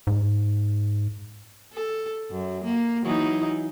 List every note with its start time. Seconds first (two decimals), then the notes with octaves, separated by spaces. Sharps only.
0.07 G#2
1.73 A4
2.31 F#2
2.64 A#3
3.04 E3 F#3 D#4